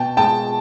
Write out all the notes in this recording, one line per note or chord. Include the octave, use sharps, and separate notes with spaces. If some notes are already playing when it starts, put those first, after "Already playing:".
Already playing: B2 G5 A5
G#3 G5 A5